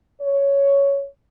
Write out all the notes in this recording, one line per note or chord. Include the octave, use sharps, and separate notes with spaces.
C#5